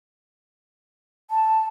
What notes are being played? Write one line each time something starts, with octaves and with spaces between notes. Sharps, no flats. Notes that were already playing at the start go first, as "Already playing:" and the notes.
A5